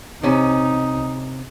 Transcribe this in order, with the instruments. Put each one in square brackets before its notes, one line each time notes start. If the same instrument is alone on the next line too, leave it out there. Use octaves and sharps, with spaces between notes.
[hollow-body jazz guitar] C3 C#4 [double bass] D#4